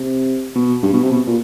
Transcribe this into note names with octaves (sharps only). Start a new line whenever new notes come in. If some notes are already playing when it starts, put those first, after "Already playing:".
Already playing: C3
B2
G2
B2
C3
B2
A#2